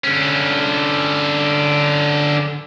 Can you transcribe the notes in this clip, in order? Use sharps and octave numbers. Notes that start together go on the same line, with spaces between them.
D3 C#4